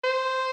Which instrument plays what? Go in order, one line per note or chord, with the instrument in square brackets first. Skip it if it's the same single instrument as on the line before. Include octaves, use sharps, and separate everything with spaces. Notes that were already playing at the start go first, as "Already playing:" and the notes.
[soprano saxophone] C5